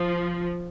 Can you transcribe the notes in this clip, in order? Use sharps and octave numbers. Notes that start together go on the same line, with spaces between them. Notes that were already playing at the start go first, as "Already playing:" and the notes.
Already playing: F3